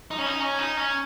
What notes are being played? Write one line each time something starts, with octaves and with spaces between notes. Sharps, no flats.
D#4
C#4
D#4
C#4
D#4
C#4